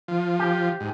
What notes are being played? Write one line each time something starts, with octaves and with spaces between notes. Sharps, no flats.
F3
G4
G#2